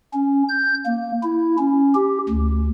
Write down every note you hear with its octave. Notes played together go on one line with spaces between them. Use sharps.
C#4
G6
A#3
E4
C#4
G4
D2